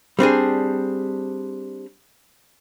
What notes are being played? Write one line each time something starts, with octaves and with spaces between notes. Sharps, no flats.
G3 C4 D4 G#4